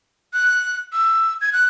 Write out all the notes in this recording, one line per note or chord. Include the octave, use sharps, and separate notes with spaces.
F#6
E6
G#6
F#6